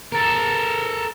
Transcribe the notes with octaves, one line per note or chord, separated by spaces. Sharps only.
A4 A#4